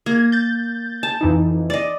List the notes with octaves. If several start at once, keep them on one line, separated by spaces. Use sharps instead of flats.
A#3 G#6
G6 A6
A5
F2 E3 D#4
D5 D#5